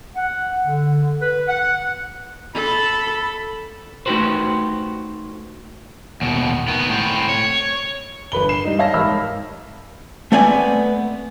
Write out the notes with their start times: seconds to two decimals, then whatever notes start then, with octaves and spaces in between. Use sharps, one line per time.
0.16 F#5
0.65 D3
1.21 B4
1.48 F#5
2.54 A4 B5
4.06 A3 D#4 F#4 G4 B4 C5
6.21 D#2 B2
6.68 D#3 B3
6.89 A2 C4
7.29 C#5
8.32 G1 B4 B5 G7
8.49 C7 E7
8.65 G3 D#4
8.79 C#5 E5 F5 A5 A#6
8.94 G#1 G#2 B5 E6 F6
10.32 A3 B3 C4 D5 G#5